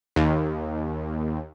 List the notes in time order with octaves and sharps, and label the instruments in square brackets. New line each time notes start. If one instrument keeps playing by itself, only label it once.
[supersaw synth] D#2